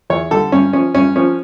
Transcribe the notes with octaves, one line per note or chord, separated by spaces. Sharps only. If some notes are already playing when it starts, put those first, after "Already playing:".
E2 C#5
D3 G3 A4
G2 C#4
F3 C#4
G2 C#4
F3 C#4